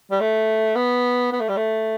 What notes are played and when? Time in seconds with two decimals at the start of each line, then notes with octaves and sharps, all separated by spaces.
0.11 G3
0.20 A3
0.76 B3
1.32 B3
1.40 A3
1.49 G3
1.57 A3